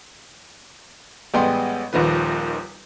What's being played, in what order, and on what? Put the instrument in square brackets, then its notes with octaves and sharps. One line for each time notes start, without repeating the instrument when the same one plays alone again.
[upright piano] A1 G3 G#3 B3 G5 C6
D#1 D#2 D#3 F3 B4